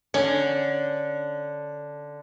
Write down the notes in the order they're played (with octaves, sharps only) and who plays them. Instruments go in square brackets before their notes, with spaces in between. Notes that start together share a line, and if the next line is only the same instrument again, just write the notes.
[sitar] D3 [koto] C#4